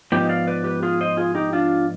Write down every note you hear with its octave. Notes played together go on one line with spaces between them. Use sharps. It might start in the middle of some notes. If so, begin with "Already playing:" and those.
G#2 F3 B3 D#4 G4
D5 F5
B4 D5
G4 B4
F4 G#4
C5 D#5
F4 G#4
D#4 G4
D4 F4